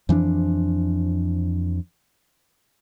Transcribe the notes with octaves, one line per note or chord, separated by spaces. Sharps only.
F2 E3 F3 D4